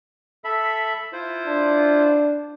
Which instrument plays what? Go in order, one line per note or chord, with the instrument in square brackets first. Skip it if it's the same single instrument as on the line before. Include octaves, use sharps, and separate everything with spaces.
[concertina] A4 E5 B5
E4 F4 C5
[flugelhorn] D4